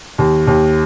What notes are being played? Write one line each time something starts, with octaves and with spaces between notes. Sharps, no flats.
D#2
D#2